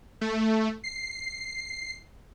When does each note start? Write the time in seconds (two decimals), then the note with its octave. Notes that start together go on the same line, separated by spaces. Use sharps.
0.21 A3
0.84 C7